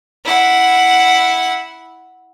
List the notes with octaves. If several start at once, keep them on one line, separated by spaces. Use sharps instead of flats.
E4 F#5